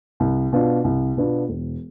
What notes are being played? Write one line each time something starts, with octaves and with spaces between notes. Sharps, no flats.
C2
B2 B3 D4 F4
C2
B2 B3 D4 F4
E1